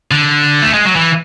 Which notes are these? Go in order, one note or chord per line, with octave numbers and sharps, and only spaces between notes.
D3
A3
G#3
F#3
E3